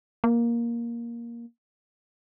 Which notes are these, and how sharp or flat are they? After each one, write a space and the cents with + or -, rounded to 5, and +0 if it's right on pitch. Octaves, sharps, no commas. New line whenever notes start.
A#3 +10